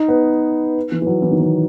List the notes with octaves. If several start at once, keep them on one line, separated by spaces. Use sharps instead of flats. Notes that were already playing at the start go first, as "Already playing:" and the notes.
Already playing: D#4
B3
E3
E3
F#3
E3
D#3
E3